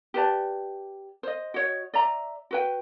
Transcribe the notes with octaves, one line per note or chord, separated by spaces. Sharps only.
G4 B4 D5 A5
C5 D#5
F#4 C#5 D#5
D5 E5 A#5
F#4 B4 G5